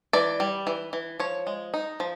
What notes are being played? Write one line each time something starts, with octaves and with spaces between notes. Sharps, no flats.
E3 D5
G3
E3
E3
F3 C#5
G#3
D#4
F3